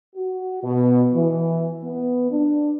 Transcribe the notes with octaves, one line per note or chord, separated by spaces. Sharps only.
F#4
B2
E3
B3
D4